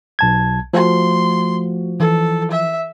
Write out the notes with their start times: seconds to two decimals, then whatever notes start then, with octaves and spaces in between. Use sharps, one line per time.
0.19 B1 A5 G#6
0.73 F3 A3 F#4 C6
2.00 E3 A4
2.51 E5